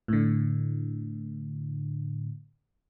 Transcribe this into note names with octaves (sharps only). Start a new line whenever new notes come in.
A2 D3